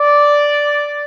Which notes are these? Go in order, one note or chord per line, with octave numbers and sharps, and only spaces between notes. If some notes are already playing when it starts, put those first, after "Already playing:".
Already playing: D5